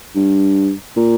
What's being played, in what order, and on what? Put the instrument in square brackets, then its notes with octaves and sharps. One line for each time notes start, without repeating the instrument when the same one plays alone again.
[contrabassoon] G2
A#2